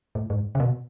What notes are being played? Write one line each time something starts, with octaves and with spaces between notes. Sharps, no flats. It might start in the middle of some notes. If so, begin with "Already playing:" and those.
A2
G#2
C#3
B2